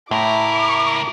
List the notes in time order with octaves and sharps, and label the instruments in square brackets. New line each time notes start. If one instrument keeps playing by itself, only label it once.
[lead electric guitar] C#2 A#4 [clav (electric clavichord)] A2 [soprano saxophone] E4 [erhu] D6